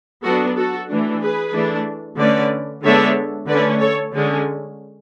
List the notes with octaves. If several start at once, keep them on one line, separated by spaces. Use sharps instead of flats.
F#3 B3 D4 F#4 A4
F#4 A4
E3 A3 D4
G#4 B4
E3 A3 D4
D3 A3 C#4 B4 D5
D3 G#3 B3 D4 C#5 E5
D3 A3 C#4 B4 D5
A4 C#5
D3 G#3 C#4